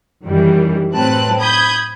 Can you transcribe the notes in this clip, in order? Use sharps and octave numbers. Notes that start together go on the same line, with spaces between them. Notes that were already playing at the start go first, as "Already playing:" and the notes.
F#2 D#3 E3 G3
A2 F#3 C4 B4 A5 F#6
B5 D#6 G6 G#6